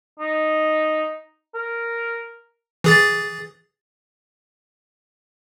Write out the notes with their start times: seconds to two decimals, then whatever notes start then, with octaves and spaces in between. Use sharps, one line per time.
0.20 D#4
1.55 A#4
2.84 E3 G#4 A6